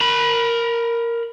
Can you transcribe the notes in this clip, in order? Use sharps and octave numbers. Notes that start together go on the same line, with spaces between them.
A#4 B5